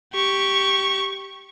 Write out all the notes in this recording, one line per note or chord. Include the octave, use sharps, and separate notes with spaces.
G4 C#6